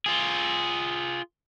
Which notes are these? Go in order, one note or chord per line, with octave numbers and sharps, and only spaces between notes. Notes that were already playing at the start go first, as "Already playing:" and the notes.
F4 G#4